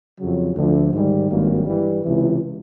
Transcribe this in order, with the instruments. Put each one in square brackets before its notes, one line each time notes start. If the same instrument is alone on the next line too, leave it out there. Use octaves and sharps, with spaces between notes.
[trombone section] F2 C#3 F#3
D2 D3 F3 A3
G#2 D#3 G3
G#1 G2 D#3 F#3 A#3
G2 E3 G3
C#2 C3 E3